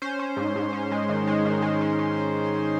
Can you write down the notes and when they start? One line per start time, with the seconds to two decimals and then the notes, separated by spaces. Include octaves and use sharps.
0.02 C#4 C5
0.19 C#4
0.37 G#2
0.56 G#2
0.73 C#4
0.91 G#3
1.09 D#3
1.27 G#3
1.45 D#3
1.62 G#3
1.81 C#4
1.99 C#4